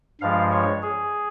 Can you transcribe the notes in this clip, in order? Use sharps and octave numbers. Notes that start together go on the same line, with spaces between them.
G2 F3 G#3 F5
C#5
G#4